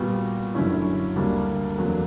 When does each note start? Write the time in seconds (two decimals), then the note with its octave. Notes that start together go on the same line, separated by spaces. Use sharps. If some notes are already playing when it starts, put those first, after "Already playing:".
Already playing: A#2 G3 B3 F#4
0.54 F#2 D3 F#3 C#4 E4
1.16 D2 D3 G3 A#3 D4
1.78 E2 D3 F#3 A#3 D4